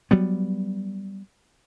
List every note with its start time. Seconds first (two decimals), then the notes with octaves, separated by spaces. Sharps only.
0.11 F#3 G3 B3